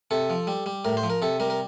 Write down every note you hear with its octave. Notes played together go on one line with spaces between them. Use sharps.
C3 A4
F3
G3
G3
A2 A#4
C5
F3
A#4
C3 A4
G3 A#4
A#4